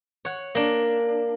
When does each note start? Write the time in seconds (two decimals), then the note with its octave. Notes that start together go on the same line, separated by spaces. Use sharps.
0.25 C#5 F#5
0.55 A#3 D4